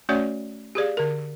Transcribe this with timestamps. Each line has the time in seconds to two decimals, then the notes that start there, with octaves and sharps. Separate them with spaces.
0.09 A3 C#4 F#4 C#5 D5 F#5
0.75 G4 G#4 D5 F5
0.97 D3 A#4